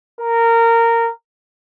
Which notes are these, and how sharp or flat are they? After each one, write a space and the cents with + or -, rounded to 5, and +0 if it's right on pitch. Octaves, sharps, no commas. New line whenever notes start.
A#4 -15